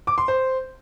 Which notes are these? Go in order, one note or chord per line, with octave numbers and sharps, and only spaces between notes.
D6
C6
C5